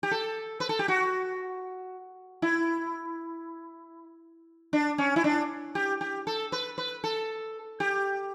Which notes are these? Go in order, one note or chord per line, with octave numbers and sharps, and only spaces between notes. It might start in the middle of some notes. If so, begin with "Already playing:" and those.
G4
A4
B4
A4
G4
F#4
E4
D4
C#4
E4
D4
G4
G4
A4
B4
B4
A4
G4